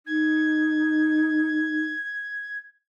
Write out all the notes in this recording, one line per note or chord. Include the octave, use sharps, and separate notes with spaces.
D#4 G#6